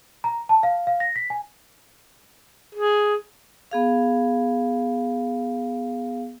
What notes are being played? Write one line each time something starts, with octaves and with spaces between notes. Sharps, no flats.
A#5
A5
F5
F5
A#6
B6
G#5
G#4
B3 G#4 F5